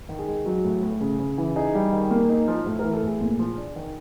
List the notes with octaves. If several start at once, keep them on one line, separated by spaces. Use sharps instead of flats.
D#3
G#4
G#3
F#3
A2
A2
C#3
C#3
E3
D#4 G#4
G3
D#3
A#3
D#4
F3
A2 A4
A#4
E3
A4
A2
G#4
A#2
F3
D4
D#3